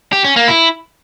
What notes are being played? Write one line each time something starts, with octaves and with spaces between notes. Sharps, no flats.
G4
C#4
A#3
E4